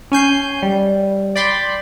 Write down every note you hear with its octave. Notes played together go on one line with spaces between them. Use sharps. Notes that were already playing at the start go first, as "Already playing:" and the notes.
C#4 G#5 G6 C7
G3
D5 G5 B5 C6 D6